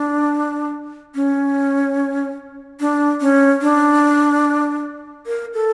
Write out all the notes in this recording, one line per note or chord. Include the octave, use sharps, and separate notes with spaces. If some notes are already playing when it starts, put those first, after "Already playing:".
Already playing: D4
C#4
D4
C#4
D4
A#4
A4